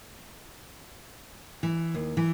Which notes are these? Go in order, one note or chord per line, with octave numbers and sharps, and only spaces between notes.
E3
D#2
E3